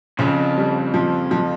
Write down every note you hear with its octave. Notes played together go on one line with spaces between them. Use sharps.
F2 C#3
G3
F3
F3